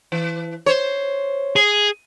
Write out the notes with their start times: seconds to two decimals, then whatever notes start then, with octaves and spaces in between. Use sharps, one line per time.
0.12 E3
0.66 C5 C#5
1.56 G#4